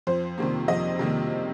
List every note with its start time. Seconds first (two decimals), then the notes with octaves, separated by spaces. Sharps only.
0.07 F2 C5
0.38 C3 D#3 G3 A#3
0.68 F2 D#5
0.99 C3 D#3 G3 A#3